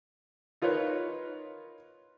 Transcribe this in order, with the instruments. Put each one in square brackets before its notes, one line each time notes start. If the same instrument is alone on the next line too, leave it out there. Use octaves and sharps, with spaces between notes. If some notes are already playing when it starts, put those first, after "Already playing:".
[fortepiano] D#4 F4 A#4 B4 C#5